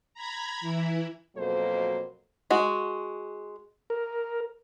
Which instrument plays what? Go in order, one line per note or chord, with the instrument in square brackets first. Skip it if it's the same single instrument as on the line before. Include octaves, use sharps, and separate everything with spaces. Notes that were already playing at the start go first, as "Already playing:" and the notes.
[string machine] A#5 B5 G#6
E3 E4
[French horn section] F2 B2 F#3 A#3 A4 C5
[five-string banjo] G#3 F#4
[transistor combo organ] A#4